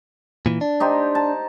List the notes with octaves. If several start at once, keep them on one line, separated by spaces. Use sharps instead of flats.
A#2 E3
D4
D#4 G4 C5
A5